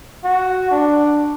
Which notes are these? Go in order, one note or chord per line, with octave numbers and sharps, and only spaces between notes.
F#4
D4